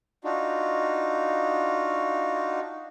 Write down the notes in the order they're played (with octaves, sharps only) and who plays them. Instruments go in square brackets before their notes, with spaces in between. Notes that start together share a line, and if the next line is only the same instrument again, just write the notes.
[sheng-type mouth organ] D4 D#4 F4 F#4